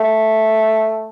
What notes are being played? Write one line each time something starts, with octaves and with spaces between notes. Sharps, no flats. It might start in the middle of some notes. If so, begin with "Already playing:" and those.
Already playing: A3